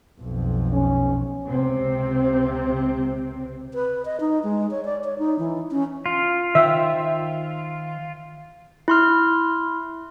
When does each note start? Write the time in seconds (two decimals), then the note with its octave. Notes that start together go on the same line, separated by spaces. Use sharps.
0.20 B1 F2
0.73 C#4
1.47 C#2 C3 C4
3.74 B4
4.05 D#5
4.20 D#4
4.43 G#3
4.71 C#5
4.85 D5
5.04 C#5
5.18 D#4
5.39 E3
5.71 C#4
6.06 F4
6.55 D#3 C5 E5 G5
8.88 E4 C6 F6